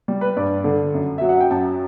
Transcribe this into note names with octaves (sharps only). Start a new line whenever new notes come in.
G3
B4
G2 D5
D3
F#2
F#3 E5
F#5
G5
F#2 A5